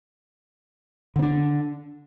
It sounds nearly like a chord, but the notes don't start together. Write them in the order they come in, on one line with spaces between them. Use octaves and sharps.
D3 C4 D4